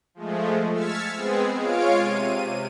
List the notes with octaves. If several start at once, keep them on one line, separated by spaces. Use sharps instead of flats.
F3 G#3 A3
E6 F6 G#6 A6 B6 C#7
G#3 B3 C4 G#4
G#3 F4 C#5 F5 D7
C3 D#7